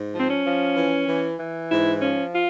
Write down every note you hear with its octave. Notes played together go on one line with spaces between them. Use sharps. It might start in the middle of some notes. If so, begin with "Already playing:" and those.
Already playing: G#2
F3 C4
C#4
F3
E3
E3
E3
G#2 E4
F3 C#4
F4